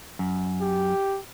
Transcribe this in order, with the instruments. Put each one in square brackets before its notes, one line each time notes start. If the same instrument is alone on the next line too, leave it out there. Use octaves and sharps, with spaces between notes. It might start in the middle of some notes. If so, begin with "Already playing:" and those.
[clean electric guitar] F#2
[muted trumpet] G4